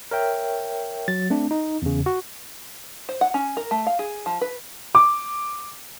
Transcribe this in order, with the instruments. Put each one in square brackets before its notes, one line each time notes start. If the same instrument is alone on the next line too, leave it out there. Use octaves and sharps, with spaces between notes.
[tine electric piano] A#4 C#5 E5 G5
F#3 A6
A3 C4 D4
D#4
E2 C#3
F#4
[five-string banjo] C5
F#5
C#4
A#4
A3
F5
G#4
F3
B4
[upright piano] D6